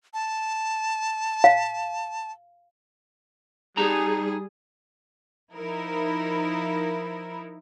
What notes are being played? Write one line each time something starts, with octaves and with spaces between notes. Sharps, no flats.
A5
F5
G3 D#4 G#4 A5 A#5
F3 D#4 E4 A#4